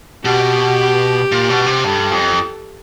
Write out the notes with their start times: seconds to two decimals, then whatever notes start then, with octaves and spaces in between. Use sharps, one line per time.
0.24 B2 G4
1.32 A#2
1.50 B2
1.66 C3
1.84 G2 A4
2.11 F2